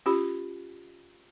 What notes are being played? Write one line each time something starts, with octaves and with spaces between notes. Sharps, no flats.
C#4 F4 G4 B5